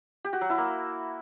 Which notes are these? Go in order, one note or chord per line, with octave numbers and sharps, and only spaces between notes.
G4
F#4
F#3
E4
A#3